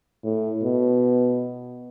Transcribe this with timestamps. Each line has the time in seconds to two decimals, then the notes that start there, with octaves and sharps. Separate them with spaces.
0.24 A2
0.63 B2